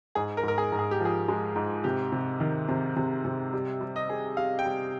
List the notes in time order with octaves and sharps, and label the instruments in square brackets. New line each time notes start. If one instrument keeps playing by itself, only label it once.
[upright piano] G#2 [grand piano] G#4
[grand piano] A#4
[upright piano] G#2
[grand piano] A#4
G#4
[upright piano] G#2
[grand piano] G#4
G4
[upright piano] F3
[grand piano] G#4
[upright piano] G#3
G#2
[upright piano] C3 [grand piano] G4
[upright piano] C3
D#3
C3
C3
C3
G3
G3
[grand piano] D#5
[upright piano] G#4
[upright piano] G3 [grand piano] F5
[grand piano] G5
[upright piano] G3